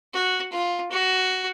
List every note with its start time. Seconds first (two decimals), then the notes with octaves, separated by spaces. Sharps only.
0.13 F#4
0.52 F4
0.91 F#4